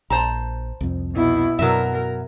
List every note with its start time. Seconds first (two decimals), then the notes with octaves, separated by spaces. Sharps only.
0.10 A#1 C5 A5 A#5
0.81 C2 F2
1.15 B2 E4
1.59 F#2 B2 F#3 A#4 E5